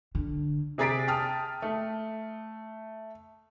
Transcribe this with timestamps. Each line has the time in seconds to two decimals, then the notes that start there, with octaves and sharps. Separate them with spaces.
0.15 D3
0.78 C3 G#4 A#5 A6 B6 D7
1.08 G5 A5 D#6 F6
1.62 A3